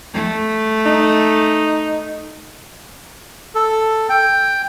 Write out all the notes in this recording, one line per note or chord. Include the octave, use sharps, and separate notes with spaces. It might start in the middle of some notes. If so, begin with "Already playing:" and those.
A3
D#4
A4
G5